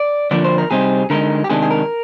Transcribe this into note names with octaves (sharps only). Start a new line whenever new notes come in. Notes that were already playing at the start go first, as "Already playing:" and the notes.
Already playing: D5
D3 F3 A#3 D4 D5
C5
A#4
C3 G3 C4 D#4 G#4
D3 G#3 D#4 A#4
G4
C3 D#3 G#3 D4 G#4
G#4
A#4